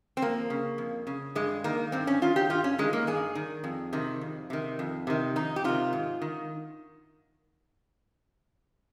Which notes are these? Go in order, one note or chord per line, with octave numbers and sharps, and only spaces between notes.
C4
F2 A#3
C#3
F2
C#3
G2 G#3
D#3 A#3
G2 C4
C#4
D#3 F4
G4
G2 F4
C#4
D#3 G#3
A#3
G2 G#4
D#3
F2
C3 D#3
F2
C3 D#3
F2
C3 D#3
F2 D#4
G4
C3 D#3 F4
G#2
D#3